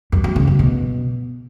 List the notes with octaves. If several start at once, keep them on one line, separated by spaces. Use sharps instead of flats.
F#2
F#2
C#3
F#2
B2